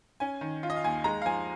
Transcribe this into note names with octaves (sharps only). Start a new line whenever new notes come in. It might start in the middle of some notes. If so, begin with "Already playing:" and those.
C#4 G#5
D#3
F4
D#5
F5
D#2 G#5
G#3 A#5
F5
F3 G#5